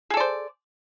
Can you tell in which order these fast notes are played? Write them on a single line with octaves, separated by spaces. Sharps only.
G#4 A4 D5 C5